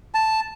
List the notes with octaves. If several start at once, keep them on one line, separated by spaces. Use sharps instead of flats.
A5